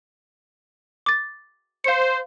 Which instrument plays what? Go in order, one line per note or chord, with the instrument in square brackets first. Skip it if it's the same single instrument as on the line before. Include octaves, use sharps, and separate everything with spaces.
[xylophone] D6 A6
[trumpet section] C5 [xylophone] F5 C#7